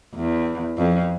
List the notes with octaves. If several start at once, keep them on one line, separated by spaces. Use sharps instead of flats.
E2
F2